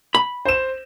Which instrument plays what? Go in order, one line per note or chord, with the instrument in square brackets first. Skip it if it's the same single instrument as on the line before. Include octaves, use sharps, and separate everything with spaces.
[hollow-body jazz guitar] B5
[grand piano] C5 E7